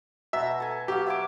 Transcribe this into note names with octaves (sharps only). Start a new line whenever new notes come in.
B2 E5 A#5
A4 G#5
F#3 G4 F5
E5 G#5 D6